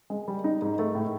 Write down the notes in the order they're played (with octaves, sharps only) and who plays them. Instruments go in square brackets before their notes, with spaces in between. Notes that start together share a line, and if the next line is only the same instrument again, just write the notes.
[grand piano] G#3
G3
D#4
G#2
A3
A2